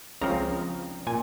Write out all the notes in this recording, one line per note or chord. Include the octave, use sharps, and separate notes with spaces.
C#2 C#3 F3 C4 A#5
A#2 G#5